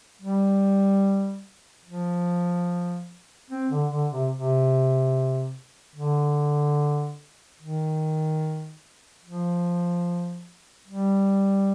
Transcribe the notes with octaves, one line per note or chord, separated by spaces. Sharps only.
G3
F3
C4
D3
D3
C3
C3
D3
D#3
F3
G3